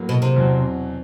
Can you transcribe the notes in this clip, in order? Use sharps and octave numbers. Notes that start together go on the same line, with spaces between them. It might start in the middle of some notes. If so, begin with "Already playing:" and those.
Already playing: A2 F#3 A#3
B2
C3
E2 B2 F#3